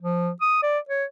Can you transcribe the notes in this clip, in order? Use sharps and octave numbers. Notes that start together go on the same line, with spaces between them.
F3
D#6
D5
C#5